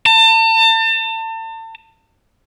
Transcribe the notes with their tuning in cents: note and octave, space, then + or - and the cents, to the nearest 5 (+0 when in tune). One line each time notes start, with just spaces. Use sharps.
A5 +35